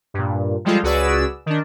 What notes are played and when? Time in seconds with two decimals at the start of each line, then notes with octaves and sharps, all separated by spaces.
0.14 G2 A#2
0.65 F3 G3 G#3 F4 A4
0.83 C#2 F#4 G#4 B4 D5 E6
1.46 D#3 D4